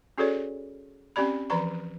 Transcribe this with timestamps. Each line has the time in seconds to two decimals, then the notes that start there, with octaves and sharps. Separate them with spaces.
0.18 C#4 F#4 G#4 A4 C#5 D5
1.16 C4 C#4 G4 D5 B5
1.50 E3 F3 D5 A#5 C#6